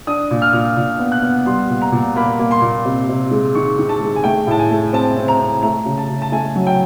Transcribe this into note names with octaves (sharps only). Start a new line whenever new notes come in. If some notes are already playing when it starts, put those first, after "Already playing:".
D4 D#6
A#2
F6
A#2
A#2
B3
F#6
B3
G3 C6
A#2
A#5
A#2
A#3 B5
A#3
C6
A#2
C3
C3
G#3
D#3 C#6
D#3
A5
G#3
G#5
A3 G5
A2 A5
G#5
A3
C4 A5
C4
A#5
C4
A3 A#5
C#3
A5
C#3
A5
A3 G#5
F#3
G5